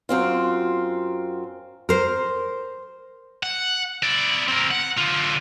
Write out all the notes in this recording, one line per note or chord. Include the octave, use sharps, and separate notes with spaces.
F#2 C4 F4
A#4 C5
F#5
E4 D5
C4 A#4
F#5
D3 F4